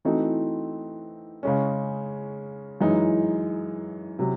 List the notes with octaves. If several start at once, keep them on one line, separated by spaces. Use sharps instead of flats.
E3 A3 C4 D#4 F#4
C#3 G#3 C#4
F#2 E3 G#3 D#4
C3 F#3